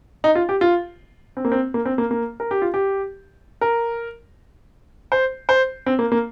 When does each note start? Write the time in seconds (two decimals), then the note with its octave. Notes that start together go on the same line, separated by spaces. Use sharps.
0.24 D#4
0.35 F4
0.49 G4
0.61 F4
1.37 C4
1.45 A#3
1.52 C4
1.74 A#3
1.85 C4
1.98 A#3
2.11 A#3
2.40 A#4
2.51 G4
2.62 F4
2.74 G4
3.61 A#4
5.12 C5
5.49 C5
5.86 C4
5.99 A#3
6.12 A#3